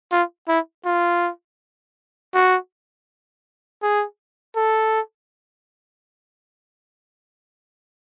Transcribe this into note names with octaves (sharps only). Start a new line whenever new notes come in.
F4
E4
F4
F#4
G#4
A4